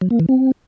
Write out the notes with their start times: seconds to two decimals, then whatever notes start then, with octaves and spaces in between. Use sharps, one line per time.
0.01 F#3
0.10 A#3
0.20 E3
0.29 C4